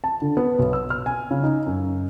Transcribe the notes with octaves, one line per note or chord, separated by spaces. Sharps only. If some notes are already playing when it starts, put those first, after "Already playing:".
A5
D3
B3
B1
E6
F6
G#5
C#3
D#4
F#2